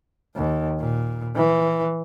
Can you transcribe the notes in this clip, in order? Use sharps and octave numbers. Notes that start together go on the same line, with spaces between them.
D#2
A#2
E3